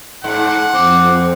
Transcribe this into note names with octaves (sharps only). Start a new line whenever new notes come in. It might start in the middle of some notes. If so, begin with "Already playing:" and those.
G#2 F#5
F2 C4 D6